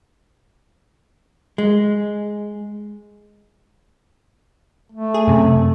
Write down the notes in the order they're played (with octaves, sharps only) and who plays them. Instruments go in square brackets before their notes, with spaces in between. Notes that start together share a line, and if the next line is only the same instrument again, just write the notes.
[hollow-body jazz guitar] G#3
[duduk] A3
[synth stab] G#4
F#2 C3